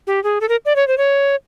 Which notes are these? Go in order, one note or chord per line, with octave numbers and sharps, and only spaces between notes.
G4
G#4
A4
A#4
D5
C#5
C5
C#5